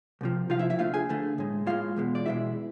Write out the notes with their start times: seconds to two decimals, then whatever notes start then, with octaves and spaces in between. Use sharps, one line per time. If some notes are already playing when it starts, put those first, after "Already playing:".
0.21 C2 C3 F3
0.50 C2 C3 F3 F4 F5
0.59 E4 E5
0.70 E4 E5
0.79 D2 D3 A3 F4 F5
0.94 G#4 G#5
1.09 D2 D3 A3
1.38 A2 G#3
1.67 A2 G#3 F4 F5
1.96 E2 B2 G#3
2.15 D5
2.26 E2 B2 G#3 E4 E5